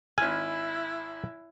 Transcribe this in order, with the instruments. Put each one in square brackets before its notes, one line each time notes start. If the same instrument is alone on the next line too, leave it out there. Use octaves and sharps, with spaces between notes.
[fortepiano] G#1 F6 [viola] E4 [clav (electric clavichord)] G#5